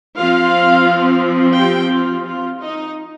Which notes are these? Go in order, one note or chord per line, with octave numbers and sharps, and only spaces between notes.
F3 C4 F4 F5
G4 G5
F4
F4
D#4 D#5